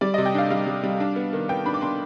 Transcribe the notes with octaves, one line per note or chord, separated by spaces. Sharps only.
G3 D5
C3 D#5
G5
D4 F5
G3 F5
G3
G3
D4
B3
D#3
B3 G5
D4 B5
D6
D4 C6